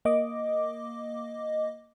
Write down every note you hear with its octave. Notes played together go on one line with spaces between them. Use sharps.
A#3 D#5 D6